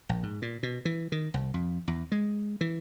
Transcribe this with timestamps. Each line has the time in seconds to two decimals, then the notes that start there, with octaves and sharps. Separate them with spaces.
0.09 A#1
0.23 G#2
0.42 A#2
0.63 B2
0.85 E3
1.12 D#3
1.34 C2
1.54 F2
1.88 E2
2.12 G#3
2.61 E3